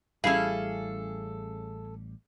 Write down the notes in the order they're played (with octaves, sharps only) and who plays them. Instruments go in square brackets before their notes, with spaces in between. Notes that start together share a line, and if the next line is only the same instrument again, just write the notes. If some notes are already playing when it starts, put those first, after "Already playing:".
[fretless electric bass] A1 G3 [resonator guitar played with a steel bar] C#4 E4 F5 [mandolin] G#4 A4